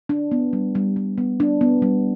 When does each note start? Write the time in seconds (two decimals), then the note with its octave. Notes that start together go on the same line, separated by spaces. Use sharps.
0.09 D4
0.32 B3
0.53 G3
0.75 G3
0.96 G3
1.18 B3
1.40 D4
1.61 B3
1.82 G3